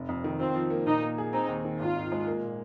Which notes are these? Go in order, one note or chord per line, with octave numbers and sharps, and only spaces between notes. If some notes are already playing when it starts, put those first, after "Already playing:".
Already playing: F1
F2
D#3
C4 F4
F3
A#3
A#2 D#4
A#3
G#4
C4 D#4
D#2
D#3
G#1 F4
G#2
G#3
A#3
A#2